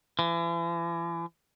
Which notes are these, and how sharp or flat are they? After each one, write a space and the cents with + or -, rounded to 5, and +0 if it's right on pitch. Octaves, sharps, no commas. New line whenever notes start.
E3 +40